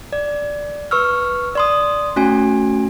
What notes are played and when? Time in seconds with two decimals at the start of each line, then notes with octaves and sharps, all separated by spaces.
0.13 D5
0.91 B4 C#6 E6 F6
1.55 D5 C6 D#6
2.16 A3 C#4 F#4 G#5